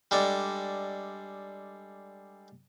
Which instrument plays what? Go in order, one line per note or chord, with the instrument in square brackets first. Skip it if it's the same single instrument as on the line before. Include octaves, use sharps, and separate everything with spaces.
[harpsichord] G3 G#3 D4 A4